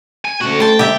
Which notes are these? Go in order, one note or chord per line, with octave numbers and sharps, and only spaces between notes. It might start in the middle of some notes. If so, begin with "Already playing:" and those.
G#5
D2 A3 C#4 F#4
C5 G5 A5
C#3 G#3 A#3 G4 E5